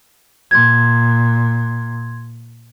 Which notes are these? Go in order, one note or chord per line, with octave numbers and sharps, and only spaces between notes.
A#2 C6 G#6